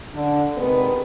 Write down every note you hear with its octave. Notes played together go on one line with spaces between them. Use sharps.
D3 D4
C3 D#3 G#3 B3